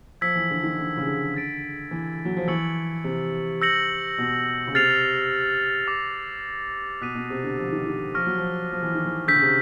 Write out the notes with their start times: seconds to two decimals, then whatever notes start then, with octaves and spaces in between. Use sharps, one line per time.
0.21 F3 E6 G#6 B6
0.35 E3
0.50 D3
0.63 D#3
0.79 D3
0.97 C#3
1.07 D3
1.34 E6 A6 D7
1.91 E3
2.25 F#3
2.37 F3
2.48 E3 C#6 E6 A6 C#7 F#7
3.04 C3
3.61 E6 G6 A#6 C#7 F#7
4.18 B2
4.67 C#3
4.74 C3 F6 A6 C7 F7
5.88 D6 F6 A#6
7.01 B2 D#6 F#6 B6 D#7
7.15 B2
7.30 C3
7.44 D3
7.59 F3
7.72 D#3
7.86 D#3
8.14 F3 C#6 F6 A#6
8.27 F#3
8.38 F3
8.72 F3
8.83 E3
8.94 D#3
9.05 E3
9.28 D3 E6 G6 B6
9.35 C#3
9.42 C3